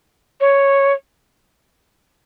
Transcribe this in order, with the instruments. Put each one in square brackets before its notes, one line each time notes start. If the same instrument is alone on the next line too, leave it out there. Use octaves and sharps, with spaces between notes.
[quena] C#5